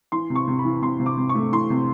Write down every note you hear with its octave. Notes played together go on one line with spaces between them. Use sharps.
E3 C6
C3
C#6
C3
B5
E3
C3 C6
C3
D6
C3
C#6
A3
E3 C6
C3